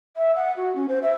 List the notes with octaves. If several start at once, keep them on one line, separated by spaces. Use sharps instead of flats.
E5
F#5
F#4
C#4
C5
E5